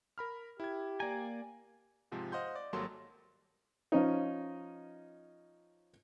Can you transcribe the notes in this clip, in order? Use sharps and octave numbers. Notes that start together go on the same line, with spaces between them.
A#4 B5 F6
E4 G4 G#6
A#3 D5 G#5 A#5
G#2 C3 F3 G#3
C5 D#5 F5 F#5 C6 G6
D5
G#1 F#3 G3 A#3 A4 C6
F3 C#4 D#4